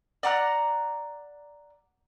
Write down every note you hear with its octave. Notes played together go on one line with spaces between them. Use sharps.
D5 F#5 A#5 F#6